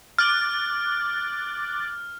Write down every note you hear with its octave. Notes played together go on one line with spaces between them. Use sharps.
D6 F6 F#6 A6